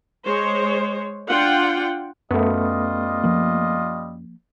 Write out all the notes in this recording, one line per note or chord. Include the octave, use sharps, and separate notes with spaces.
G#3 C5 C#5
D4 F4 F#5 G5
F#2 G3 A3 B3 F4 D#5
F3 A#3